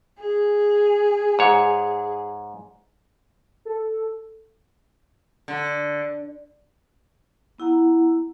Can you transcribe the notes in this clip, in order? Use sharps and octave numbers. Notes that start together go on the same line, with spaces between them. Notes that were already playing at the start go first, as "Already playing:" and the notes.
G#4
G#2 C#5
A4
D3
B3 E4 F#5 A#5